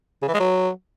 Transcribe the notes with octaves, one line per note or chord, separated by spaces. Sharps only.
C#3
E3
G#3
F#3